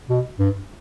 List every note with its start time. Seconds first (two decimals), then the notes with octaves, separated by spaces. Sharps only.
0.10 B2
0.39 G2